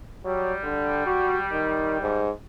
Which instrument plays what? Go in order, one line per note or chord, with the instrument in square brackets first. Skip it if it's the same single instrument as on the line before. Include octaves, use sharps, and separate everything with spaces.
[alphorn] F#3 [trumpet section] G3
[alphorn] D3
F#4
D#3
G#2